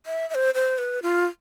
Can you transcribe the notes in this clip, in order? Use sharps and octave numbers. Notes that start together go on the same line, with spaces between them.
E5
E5
C5
C5
B4
F4